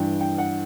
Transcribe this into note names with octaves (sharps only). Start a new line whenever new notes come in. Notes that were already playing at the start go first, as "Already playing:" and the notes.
Already playing: G2 E3 G5
G5
F#5